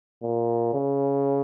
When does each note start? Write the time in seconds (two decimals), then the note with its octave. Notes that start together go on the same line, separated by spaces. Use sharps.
0.23 A#2
0.74 C#3